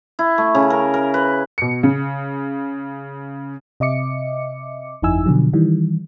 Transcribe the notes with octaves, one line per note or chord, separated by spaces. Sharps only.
E4
A3
C#3
A#4
A#4
B4
B2 C#7
C#3
C3 D#5 E5 D6 C#7
G1 F2 D#4 E4 G#5 E6
B2 D3 F3 F#3
D#3 E3 G3